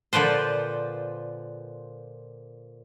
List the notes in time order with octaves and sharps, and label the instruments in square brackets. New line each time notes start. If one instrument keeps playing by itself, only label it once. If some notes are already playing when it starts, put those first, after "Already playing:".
[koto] A#2 D3 F3 B4 C5